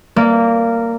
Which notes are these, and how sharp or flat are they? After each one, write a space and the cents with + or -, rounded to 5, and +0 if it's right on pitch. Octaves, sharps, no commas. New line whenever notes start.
A#3 -15 D5 +0